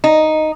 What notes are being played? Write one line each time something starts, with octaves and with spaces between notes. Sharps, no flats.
D#4